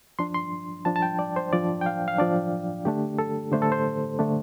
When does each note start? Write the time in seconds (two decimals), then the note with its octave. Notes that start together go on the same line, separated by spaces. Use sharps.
0.19 F3 D4 C6
0.34 C6
0.85 F3 D4 A5
0.96 A5
1.02 G5
1.19 D5
1.36 C5
1.53 F3 D4 D5
1.81 G5
1.86 F5
2.08 F5
2.19 F3 D4 D5
2.85 D3 A3 D4 G4
3.19 A4
3.52 D3 A3 D4 C5
3.62 A4
3.72 C5
4.19 D3 A3 D4